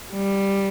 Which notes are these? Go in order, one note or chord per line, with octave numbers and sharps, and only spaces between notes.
G3